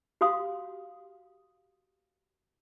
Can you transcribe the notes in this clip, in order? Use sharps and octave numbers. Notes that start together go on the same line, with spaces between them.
F#4 G4 F5 C6 D#6